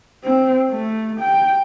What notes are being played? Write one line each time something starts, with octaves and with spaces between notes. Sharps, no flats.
C4
A3
G5